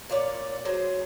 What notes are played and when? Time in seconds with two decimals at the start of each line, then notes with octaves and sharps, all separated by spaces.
0.10 A#2 F4 C#5 D5
0.65 F#3 G#4 C5